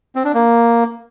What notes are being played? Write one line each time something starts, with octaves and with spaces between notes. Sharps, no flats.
C4
D4
A#3